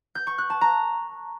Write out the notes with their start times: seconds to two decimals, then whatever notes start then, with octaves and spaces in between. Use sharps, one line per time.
0.15 G6
0.27 C#6
0.38 F#6
0.50 A5
0.61 A#5